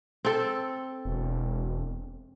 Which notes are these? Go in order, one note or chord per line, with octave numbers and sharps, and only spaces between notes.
C4 A4
E1